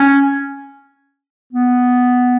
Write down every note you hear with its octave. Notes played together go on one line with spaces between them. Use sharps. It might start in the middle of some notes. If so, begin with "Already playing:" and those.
Already playing: C#4
B3